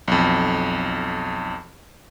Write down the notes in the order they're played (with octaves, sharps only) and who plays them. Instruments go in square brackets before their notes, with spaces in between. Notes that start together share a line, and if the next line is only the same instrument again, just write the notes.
[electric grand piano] B1 F2